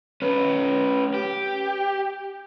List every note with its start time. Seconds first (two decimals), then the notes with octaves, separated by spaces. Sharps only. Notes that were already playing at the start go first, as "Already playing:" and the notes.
0.22 C#4 B4
1.14 G4